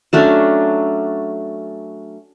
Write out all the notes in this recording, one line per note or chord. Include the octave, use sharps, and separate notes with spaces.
F#3 A3 C#4 D4